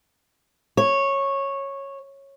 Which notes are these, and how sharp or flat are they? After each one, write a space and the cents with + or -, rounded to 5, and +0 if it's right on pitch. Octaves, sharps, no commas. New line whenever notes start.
C#5 -10